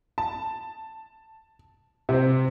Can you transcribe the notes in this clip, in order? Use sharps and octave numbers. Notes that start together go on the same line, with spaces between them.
A5
C3 C4